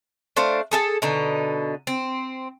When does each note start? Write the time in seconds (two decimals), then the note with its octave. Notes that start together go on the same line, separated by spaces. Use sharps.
0.36 A3 D4 C5 F5
0.71 G#4 A4 E5 A5
1.02 B2 D3 D#4
1.87 C4